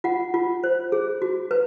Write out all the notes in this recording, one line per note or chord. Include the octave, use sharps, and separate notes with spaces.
F4 F#5
F4
C5
G#4
F#4
B4